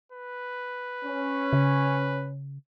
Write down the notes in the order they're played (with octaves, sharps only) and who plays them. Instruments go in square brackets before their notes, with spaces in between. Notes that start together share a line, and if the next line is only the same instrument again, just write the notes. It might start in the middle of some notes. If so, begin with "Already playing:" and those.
[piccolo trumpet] B4
[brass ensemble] C#4
[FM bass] C#3